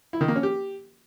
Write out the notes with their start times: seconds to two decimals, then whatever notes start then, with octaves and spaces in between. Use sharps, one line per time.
0.13 E4
0.21 D#3
0.28 A#3
0.36 C#4
0.43 G4